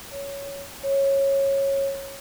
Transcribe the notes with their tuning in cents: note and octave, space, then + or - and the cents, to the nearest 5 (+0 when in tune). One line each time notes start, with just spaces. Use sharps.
C#5 +10
C#5 -15